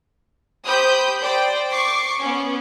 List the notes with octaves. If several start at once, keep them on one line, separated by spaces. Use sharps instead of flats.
G4 C5 B5 D#6 G6
C5 D5 G5
C#6 D6 C7
B3 C#4